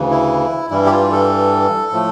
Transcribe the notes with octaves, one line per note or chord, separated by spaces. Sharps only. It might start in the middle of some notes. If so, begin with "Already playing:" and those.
Already playing: D2 C#3 E3
E4
G2 E3 G3 E4
G4
F4
A4
A2 F3 A3